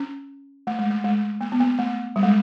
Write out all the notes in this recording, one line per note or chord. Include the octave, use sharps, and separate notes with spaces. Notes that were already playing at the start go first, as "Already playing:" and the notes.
Already playing: C#4
A3
G#3
A3
G#3
A#3
B3
A#3
A3
G3
G#3